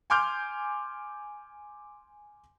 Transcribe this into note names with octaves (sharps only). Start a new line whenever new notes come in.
G#5 C6 D6 F6 G6